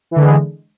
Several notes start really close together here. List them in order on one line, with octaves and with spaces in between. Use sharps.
E3 D3 G#3